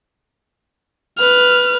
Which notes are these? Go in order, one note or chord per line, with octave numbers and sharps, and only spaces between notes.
B4 F6